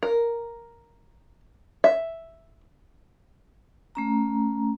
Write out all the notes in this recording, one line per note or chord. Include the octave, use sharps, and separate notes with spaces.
A#4
E5
A3 C#4 A#5